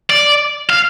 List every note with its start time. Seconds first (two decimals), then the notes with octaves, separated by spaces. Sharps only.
0.10 D5
0.70 F5